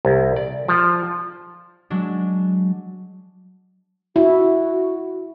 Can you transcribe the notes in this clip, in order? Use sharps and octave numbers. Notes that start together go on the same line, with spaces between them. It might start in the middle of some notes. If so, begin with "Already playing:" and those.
C2
D5
F3
F#3 G#3 D4
E4 F#4